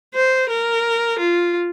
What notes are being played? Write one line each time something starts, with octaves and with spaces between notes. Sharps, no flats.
C5
A#4
F4